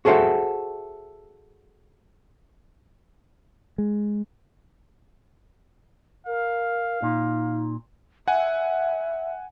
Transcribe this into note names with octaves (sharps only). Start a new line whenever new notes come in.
F#4 G#4 A4 C5 E5 F#5
G#3
A#4 F5
A#2 D#4
E5 F#5 G#5